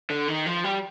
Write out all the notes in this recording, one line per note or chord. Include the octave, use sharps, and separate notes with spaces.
D3
D#3
F3
G3